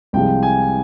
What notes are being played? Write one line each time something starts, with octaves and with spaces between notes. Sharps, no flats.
C2 C3 F3 G#3 G5
G#5